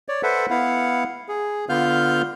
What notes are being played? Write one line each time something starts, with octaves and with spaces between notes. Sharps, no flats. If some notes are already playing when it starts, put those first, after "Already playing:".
C#5 D5
A4 B4 C5 E5 F#5
B3 E4 F5 F#5
G#4
D3 B3 F4 F5 F6 G6